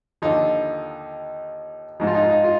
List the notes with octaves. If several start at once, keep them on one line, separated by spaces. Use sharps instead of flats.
D#2 D3 F3 D#4
G#2 F3 D#4
F4
D#4
F4
D#4
F4